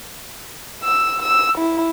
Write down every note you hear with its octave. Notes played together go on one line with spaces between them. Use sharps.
E6
E6
E4